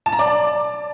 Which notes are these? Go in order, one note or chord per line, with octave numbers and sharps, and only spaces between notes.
A5
A#5
D5